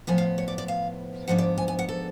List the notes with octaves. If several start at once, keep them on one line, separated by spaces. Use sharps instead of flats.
A2 F3 B3 G#5
F5
C#5
D5
D5
F5
G#2 F3 B3 D4 F#5
D5
G#5
G#5
F#5
A4